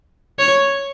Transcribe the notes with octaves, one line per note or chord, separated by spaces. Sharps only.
C#5